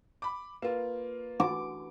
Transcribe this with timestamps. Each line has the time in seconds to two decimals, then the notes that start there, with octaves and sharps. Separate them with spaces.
0.22 B5 D6
0.62 A#3 F4 B4
1.40 D6